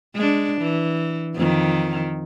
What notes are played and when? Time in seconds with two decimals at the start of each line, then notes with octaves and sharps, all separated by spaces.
0.15 G#3 D4
0.62 E3
1.35 F2 D#3